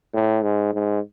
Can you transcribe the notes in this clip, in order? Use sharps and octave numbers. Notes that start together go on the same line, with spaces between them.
A2
G#2
G#2